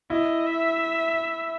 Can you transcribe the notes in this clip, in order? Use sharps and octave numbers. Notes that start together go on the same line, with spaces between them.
E4 D#5
E5